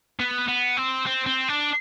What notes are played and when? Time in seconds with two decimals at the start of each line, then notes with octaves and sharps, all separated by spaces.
0.20 B3
0.48 B3
0.77 C4
1.06 C4
1.26 C4
1.48 D4